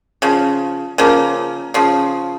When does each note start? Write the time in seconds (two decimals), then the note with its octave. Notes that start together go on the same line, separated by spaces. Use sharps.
0.22 C#3 F3
0.98 C#3 F3 A#3
1.74 C#3 F3